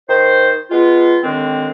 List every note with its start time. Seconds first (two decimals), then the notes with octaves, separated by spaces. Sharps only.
0.09 D#3 C5
0.71 G#3 B3 F4
1.24 D#2 D3 D#3 G#3 C4